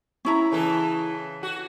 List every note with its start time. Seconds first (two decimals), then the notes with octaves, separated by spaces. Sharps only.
0.25 C#4 E4 A#5
0.52 C#3 E3 A4
1.43 F#4